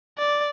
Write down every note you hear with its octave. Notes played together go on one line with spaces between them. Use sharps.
D5